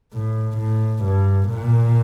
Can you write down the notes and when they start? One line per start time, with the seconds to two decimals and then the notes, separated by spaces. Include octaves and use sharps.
0.13 A2
0.58 A2
1.04 G2
1.49 A#2